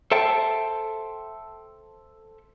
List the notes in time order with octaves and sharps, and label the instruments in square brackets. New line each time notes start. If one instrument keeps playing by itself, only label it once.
[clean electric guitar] A4 C5 E5 G5 A5